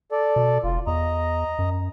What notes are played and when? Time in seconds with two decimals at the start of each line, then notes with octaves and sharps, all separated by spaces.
0.12 A4 D5
0.36 B2
0.64 F1 F4
0.87 E2 D#5 A#5
1.59 F#2